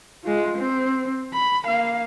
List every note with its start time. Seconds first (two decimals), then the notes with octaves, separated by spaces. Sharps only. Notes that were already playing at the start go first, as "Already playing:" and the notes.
0.24 G#3 F4
0.58 C4
1.34 B5
1.65 A#3 F5